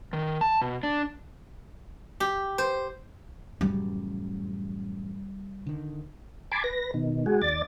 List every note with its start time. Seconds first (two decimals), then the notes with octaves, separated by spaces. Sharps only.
0.13 D#3
0.41 A5
0.61 B2
0.83 D4
2.20 G4
2.58 C5
3.61 A1 F#2 C#3 G3
5.66 D3 D#3
6.52 G#5 A5 B5 C6 D6
6.64 B4 A#6
6.94 B2 D#3
7.26 G#3 F#4 G#4
7.42 D#2 D5 A6